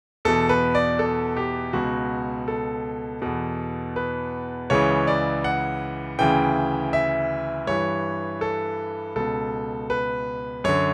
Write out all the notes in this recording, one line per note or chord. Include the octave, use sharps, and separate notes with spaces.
E2 B2 A4
B4
D5
A4
G4
C#2 B2 F#4
A4
E2 B2
B4
C#2 C#3 E3 C#5
D5
F#5
D2 C#3 E3 G5
E5
G2 E3 C#5
A4
C#2 B2 A4
B4
F#2 D3 C#5